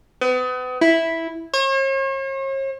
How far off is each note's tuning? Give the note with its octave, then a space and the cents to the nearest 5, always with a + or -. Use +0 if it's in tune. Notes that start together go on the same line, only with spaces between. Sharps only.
B3 +35
E4 -5
C#5 -45